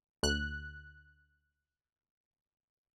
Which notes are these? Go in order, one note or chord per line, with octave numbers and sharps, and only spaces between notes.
D2 F#6